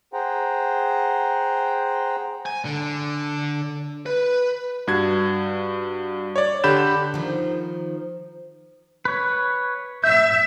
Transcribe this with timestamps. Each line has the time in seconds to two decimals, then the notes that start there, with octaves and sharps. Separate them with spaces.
0.13 G#4 C5 F#5 G5 A#5
2.46 G#5
2.65 D3
4.06 B4
4.88 G2 F#4 G#6
6.36 C#5 D5
6.64 D3 G4 B5 G6 E7
7.14 D#3 F3
9.05 B4 C#5
10.04 E5 G6